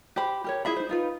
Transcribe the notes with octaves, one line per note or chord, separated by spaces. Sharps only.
G4 C5 B5
G4 A#4 C#5
E4 G#4 E5 B5
D#4 C5
D#4 F4 B4